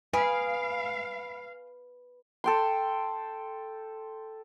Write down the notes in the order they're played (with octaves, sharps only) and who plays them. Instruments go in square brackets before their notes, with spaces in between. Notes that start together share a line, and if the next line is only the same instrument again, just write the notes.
[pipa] G#4 [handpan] B4 [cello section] F5 [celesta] B5 D7
[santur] A4 G5 C6